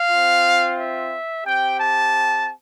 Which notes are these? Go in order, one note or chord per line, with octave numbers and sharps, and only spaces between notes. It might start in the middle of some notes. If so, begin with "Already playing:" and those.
Already playing: F5
C4 F4
E5
C4 G4 G5
A5